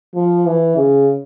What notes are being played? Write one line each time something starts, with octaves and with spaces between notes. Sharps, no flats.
F3
E3
C#3